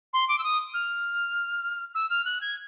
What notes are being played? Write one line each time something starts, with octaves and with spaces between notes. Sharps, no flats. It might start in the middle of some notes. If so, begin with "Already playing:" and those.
C6
D6
E6
D#6
F6
E6
F6
F#6
G#6